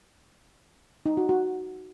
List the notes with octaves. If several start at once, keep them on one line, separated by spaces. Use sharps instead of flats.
D#4
F#4
F#4